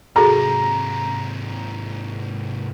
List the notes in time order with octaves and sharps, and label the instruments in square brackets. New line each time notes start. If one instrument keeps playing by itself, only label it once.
[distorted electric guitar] G#2 C3 [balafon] F#4 G#4 A4 [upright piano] A#5